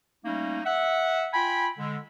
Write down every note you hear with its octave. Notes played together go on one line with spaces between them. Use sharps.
G3 A3 A#3 C#4 D#4
E5 F#5
F4 G5 G#5 B5
D3 G#3